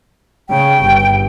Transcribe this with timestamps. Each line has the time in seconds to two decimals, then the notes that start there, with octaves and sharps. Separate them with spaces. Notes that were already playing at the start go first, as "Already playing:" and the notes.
0.49 C#3 G5
0.84 G1